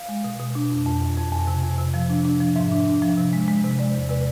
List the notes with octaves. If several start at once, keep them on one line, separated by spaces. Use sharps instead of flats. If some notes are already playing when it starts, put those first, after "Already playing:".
Already playing: F5
G#3
B2
B2
D4
F2
F2
F2
F2
F2 G#5
C3
F2
C3
F3
D4
D4
F3
G#2 E5
D4
D4
F3
C3
G#3
G#3
C3
G#3 D5
E2
C3 B4